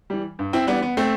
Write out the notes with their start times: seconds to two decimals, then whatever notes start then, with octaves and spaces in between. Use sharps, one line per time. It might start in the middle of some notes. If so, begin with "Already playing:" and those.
0.10 E3 G3
0.39 G2
0.53 C4 E4
0.67 E3 G3 B3 D4
0.82 B3
0.97 A3 C4